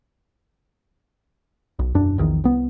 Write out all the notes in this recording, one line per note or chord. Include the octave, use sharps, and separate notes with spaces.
B1
E1 F#2 D4
A#1 E2 D#3
C2 B3